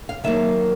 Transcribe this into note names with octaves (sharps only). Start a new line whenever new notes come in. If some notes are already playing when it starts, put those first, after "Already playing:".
F5
D#3 F#3 A#3 E5